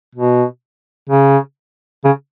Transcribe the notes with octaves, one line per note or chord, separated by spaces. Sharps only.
B2
C#3
C#3